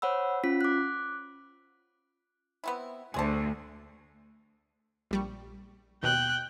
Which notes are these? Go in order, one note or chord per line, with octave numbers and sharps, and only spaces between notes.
C5 C#5 F#5 B5 E6
C#4 F4 B6
D6 F#6
B3 C4 E4
D2 G#4 C5 A5
A#1 G3 C#6
D#2 B2 G5 F#6